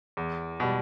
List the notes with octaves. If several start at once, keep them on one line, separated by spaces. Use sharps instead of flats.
E2
B2 G3